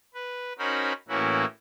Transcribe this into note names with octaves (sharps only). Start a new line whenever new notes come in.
B4
C#4 D#4 F#4 A#4 C5 B5
A2 E3 A#3 C#4 E4 F#4